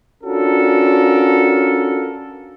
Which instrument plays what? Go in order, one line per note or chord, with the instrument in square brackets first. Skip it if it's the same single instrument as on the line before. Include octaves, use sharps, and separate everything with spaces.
[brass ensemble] C#4 D4 F4 F#4 A4 A#4